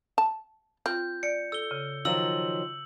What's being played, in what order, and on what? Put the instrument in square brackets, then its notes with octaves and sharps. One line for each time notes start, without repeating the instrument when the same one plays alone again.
[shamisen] A5
[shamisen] C4 [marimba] F4 [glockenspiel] G6
[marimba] D5 [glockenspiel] C#7
[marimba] A4 [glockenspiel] E6 G7
[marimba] C#3
[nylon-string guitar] D#3 F3 F#3 [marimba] F5 [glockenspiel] E6 F#7